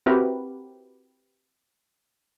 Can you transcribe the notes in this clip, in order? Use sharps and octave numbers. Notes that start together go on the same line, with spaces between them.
C4 E4 F#4 G4 A#4 B4